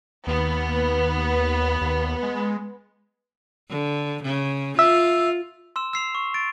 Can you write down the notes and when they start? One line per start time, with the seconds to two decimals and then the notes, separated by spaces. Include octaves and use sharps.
0.27 D#2 B3
1.81 D#2
2.23 G#3
3.70 D3
4.24 C#3
4.79 F4 E5
5.76 C6 E6 E7
5.93 E6 C7 F7
6.15 C#6
6.34 A6 D7